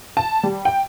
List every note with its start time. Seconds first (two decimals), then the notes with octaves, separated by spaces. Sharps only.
0.17 A5
0.43 G3
0.65 G5